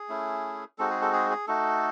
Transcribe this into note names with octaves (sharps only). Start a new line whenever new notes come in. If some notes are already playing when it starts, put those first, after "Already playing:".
Already playing: G#4
A3 C#4 E4
G#3 C4 D#4 F#4 A4
G#4
A4
G#4
G#4
A3 D#4 F#4 A4